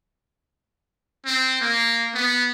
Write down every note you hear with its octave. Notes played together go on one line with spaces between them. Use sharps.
C4
A#3
B3